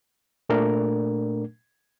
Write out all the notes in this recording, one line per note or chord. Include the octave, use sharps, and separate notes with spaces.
A#2 A3 D4 A#4